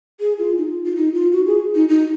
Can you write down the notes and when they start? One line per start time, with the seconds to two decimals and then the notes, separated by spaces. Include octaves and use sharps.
0.20 G#4
0.39 F4
0.58 D#4
0.85 F4
0.96 D#4
1.14 F4
1.32 F#4
1.47 G#4
1.75 D#4
1.89 D#4